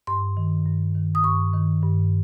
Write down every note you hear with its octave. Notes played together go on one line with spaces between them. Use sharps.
G2 C6
D#3
G2
D#3
D#6
G2 C#6
D#3
G2